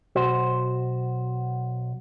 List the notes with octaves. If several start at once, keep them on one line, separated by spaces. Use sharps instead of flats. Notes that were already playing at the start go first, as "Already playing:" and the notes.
B1 F#4 C5